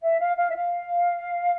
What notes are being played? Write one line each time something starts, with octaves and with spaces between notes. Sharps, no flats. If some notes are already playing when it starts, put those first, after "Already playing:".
E5
F5
F5
E5
F5